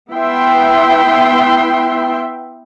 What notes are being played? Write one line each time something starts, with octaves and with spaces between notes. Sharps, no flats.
B3 E4 E5 G5 C6